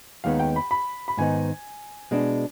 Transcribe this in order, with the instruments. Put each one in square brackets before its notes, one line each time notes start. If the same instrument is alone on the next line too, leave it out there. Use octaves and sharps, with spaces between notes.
[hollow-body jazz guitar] D#2 D#3 G#3 B3 [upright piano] F5
[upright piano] G5
B5
B5
B5
[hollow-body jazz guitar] G#2 D#3 B3 D#4 [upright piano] G#5
[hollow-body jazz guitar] B2 G#3 D4